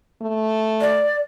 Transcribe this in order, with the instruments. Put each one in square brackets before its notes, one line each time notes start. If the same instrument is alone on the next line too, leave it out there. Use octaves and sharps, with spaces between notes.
[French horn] A3
[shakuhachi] D5